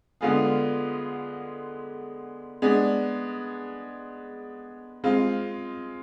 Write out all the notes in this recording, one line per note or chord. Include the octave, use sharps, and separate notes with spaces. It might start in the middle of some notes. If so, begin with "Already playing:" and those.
D3 G#3 B3 F4 G#4
G#3 B3 D4
G#3 C4 F4